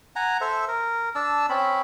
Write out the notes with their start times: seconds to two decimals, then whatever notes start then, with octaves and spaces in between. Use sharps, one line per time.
0.16 F#5 G#5 A#5
0.41 A4 C5 E5
0.68 A#4
1.15 D4 A5 E6
1.49 C4 C#4 B5